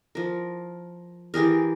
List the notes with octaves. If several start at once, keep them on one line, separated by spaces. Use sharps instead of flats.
F3 A#4
E3 G4 G#4 A#4